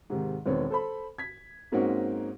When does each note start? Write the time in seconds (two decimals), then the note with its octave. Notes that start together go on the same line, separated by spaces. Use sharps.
0.10 G#2 C3 D#3
0.46 E1 D#3 B3 C4 C#5
0.70 A4 C5 B5
1.18 G#6 B6
1.72 G#2 A#3 C4 C#4 D#4 F#4